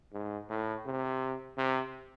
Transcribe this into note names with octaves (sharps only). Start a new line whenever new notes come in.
G#2
A2
C3
C3